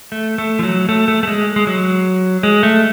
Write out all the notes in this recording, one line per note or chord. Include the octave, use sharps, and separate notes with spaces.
A3
A3
F3
F#3
A3
A3
A3
G#3
G#3
F#3
G#3
A3